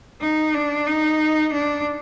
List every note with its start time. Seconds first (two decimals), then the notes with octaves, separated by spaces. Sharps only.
0.21 D#4
0.54 D4
0.87 D#4
1.53 D4